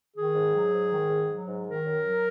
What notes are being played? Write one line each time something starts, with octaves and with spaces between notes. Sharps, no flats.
D#3 G#4
G#2
F#3
G#2
D#3
G#2
F#3
G#2
D#3 A#4
F#2
F#3